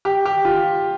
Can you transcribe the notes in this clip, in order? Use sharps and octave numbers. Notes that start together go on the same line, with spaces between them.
G4
G4
F4